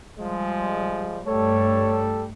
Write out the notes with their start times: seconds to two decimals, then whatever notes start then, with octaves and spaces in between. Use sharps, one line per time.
0.17 F3 G3 G#3
1.27 G2 G3 A3 A4 C#5